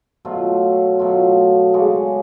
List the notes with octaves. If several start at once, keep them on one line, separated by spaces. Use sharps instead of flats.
B2 F#3 A3 F4
B2 F#3 A3 F4
C#3 G#3 D4 F#4